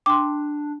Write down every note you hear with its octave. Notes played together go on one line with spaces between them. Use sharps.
D4 G5 C6 D6